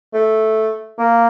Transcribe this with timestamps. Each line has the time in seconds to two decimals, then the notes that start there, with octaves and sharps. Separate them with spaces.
0.14 A3
0.98 A#3